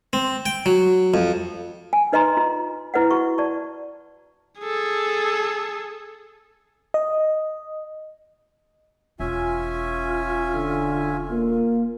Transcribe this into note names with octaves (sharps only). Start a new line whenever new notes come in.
C4
G5
F#3
F2
G#5
D#4 B4 D#5 G#5 A#5 C6
F4
E4 B4 D#5 F#5
F#4 C#6
D5 A5 C#6
G#4 A4
D#5
E1 C#4 F4 E5 G#5
D3
A#3